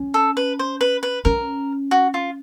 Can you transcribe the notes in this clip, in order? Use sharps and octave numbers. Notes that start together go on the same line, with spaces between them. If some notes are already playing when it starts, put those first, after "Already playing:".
Already playing: C#4
A4
B4
C5
B4
B4
C#4 A#4
F#4
F4